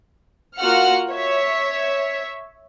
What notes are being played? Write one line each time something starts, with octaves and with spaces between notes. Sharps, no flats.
A#3 F4 F#4 F#5 F6 C#7
C#5 E5